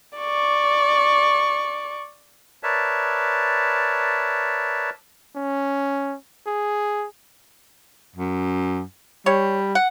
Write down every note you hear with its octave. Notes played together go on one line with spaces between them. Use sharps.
D5 C#6
A#4 B4 C#5 D5 E5 A5
C#4
G#4
F#2
G3 C#5
F#5